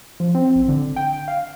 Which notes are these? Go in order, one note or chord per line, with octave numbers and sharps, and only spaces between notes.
F3
C4
A1
D3
G5
F5